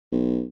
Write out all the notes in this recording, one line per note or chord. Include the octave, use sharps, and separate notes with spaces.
B1